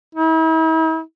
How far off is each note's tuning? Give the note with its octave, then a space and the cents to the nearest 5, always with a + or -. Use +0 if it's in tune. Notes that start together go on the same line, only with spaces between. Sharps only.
E4 -45